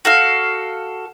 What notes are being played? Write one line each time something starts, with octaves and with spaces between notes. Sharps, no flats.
F#4 A4 F5